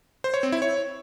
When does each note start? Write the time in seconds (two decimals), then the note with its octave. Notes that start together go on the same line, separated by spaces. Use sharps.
0.24 C5
0.34 C#5
0.43 C4
0.52 E4
0.62 C#5